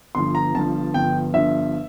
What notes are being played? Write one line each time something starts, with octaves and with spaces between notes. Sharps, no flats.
G1 G2 F3 C6
A#5
G1 G2 F3 A5
G1 G2 F3 G5
G1 G2 F3 E5